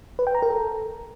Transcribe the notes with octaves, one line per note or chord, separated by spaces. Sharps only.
B4
G5
A#5
A#4
A4